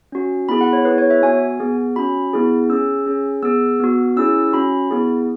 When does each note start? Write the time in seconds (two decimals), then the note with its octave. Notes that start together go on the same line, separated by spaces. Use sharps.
0.12 C#4 F#4
0.49 B3 E4 G#4 B5
0.61 F#5
0.73 C#5
0.85 B3 E4 G#4 B4
0.98 C#5
1.10 E5
1.22 B3 F#4 G#5
1.60 B3 G#4
1.96 C#4 F#4 B5
2.33 B3 E4 G#4
2.69 C#4 G#4 E6
3.06 C#4 G#4
3.43 B3 G#4 E6
3.80 B3 F#4
4.17 C#4 E4 G#4 E6
4.53 C#4 F#4 B5
4.91 B3 E4 G#4